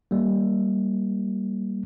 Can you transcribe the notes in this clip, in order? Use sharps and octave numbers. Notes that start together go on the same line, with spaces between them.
G3 A#3